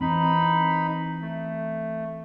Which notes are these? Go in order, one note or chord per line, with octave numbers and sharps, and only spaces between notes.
E3 C4 D#4 B5
A3